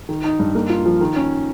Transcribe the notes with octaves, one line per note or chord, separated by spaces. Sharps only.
D#3
D#4
G2
A#3
F4
F3
D#3
C#4